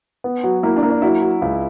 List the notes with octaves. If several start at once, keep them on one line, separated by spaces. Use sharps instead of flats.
B3
F#3
A#3 E4
D4
A#3
D4
F#3 E4
F#3
C#2